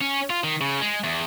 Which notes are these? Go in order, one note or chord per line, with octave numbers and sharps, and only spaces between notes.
C#4
F4
D#3
C#3
G#3
E2